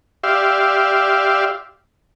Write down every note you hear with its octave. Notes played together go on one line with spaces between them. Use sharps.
G4 D5 E5 F5 C6